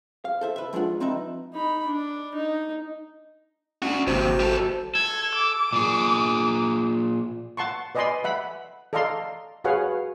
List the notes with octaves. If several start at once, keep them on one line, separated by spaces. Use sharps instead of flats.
F5
A4 C5 E5
B4 E5
G#2 F3 G#3 D4 F4 F#5
F3 C4 D#4 B4 E5
D#4 B5
D4
D#4
C#4 D4 F#4
G#1 D#2 C3 F#4 C5
G3 A4
A4 G#6
D6
A#2 G#4
F#5 A5 C6 C#6
B4 D5 D#5 G#5 B5 C6
E5 F#5 B5
A4 D5 D#5 F5 A#5 C6
F#4 G#4 B4 C#5 F5 F#5